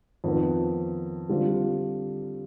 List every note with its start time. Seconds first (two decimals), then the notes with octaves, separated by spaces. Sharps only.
0.24 F2 D#3 B3
1.29 D3 G3 C4 F4